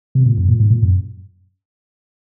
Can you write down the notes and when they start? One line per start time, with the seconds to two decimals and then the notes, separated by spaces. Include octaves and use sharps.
0.15 C3
0.26 A#2
0.38 F#2
0.48 A#2
0.60 G#2
0.70 A#2
0.82 F#2